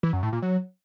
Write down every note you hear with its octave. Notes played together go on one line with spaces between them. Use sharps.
E3
F#2
A2
A#2
F#3